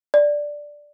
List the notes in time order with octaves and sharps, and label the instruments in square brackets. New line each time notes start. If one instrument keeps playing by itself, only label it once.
[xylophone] D5